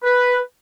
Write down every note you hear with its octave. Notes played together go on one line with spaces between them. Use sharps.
B4